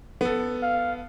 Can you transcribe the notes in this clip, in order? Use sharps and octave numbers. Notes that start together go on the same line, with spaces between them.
B3 A4
F5